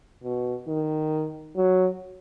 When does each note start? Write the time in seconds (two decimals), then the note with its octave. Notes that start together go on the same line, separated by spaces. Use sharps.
0.23 B2
0.67 D#3
1.56 F#3